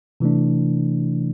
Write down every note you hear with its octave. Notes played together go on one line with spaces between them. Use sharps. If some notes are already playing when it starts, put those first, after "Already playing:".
C3 E3 A3 D4